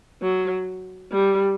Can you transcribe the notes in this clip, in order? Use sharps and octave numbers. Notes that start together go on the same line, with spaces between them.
F#3
G3